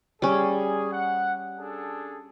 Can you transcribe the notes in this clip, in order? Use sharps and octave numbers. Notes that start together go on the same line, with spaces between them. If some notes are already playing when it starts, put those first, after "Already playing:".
G3 C#4 G#4
F#5
D4 G#4 A4